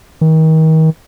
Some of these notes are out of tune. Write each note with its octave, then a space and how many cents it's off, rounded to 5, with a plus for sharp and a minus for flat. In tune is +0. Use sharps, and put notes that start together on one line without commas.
D#3 +35